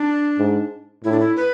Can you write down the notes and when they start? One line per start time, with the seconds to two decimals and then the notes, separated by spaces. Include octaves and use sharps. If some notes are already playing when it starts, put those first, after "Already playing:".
Already playing: D4
0.38 G#2
1.04 A2 E4
1.12 D4
1.20 E4
1.37 B4